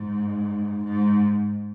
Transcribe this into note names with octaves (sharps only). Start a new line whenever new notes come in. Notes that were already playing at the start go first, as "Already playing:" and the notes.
Already playing: G#2
G#2